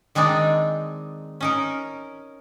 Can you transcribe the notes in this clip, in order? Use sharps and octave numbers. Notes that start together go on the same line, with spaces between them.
D#3 G#3 C4 D4 D#4
C#4 D#4 A#4